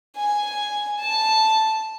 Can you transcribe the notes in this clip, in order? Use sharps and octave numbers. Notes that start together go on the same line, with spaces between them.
G#5
A5